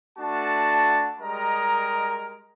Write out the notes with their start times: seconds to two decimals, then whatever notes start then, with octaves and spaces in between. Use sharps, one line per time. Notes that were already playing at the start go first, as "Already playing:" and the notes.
0.19 A3 D4 F#4 A5
1.20 G3 G#3 A#4 D#5 A#5